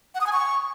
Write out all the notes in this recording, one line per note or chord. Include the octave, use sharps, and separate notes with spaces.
F#5
D#6
G#5
C#6